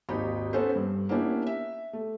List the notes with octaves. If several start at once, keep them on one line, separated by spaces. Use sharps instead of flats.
G#1 D#2 D#4 G4 B5
B3 C#4 A4 B4 C5
G2
A#3 B3 C#4 D4 E4 G4
E5
A3